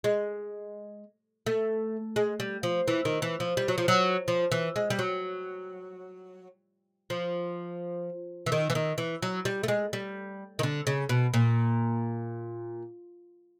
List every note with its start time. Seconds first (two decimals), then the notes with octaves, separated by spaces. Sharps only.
0.04 G#3
1.46 A3
2.16 G#3
2.40 G3
2.63 F3
2.88 E3
3.05 D#3
3.22 E3
3.40 F3
3.57 G3
3.68 F#3
3.78 F3
3.88 F#3
4.28 F3
4.52 E3
4.76 G#3
4.90 G3
4.99 F#3
7.10 F3
8.46 E3
8.52 D#3
8.70 E3
8.75 D#3
8.98 E3
9.22 F#3
9.45 G3
9.63 A3
9.68 G#3
9.93 G3
10.59 D#3
10.63 D3
10.87 C#3
11.09 B2
11.34 A#2